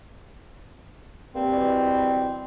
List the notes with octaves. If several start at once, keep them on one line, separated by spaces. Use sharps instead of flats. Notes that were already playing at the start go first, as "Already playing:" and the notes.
G2 A#2 C4
B2 E3 G3